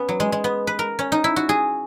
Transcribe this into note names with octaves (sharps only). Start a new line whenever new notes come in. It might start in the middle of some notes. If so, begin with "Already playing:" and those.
Already playing: B3 C#4
F#3
G#3
G#3
B3
B4
A#4
C#4
D#4
E4
F#4
G#4